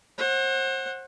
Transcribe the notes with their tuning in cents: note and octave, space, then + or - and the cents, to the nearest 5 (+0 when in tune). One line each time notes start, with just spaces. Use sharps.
C5 +35 F#5 +0